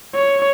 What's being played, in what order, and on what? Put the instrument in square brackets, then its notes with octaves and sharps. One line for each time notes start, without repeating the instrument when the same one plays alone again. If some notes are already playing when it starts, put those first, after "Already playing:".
[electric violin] C#5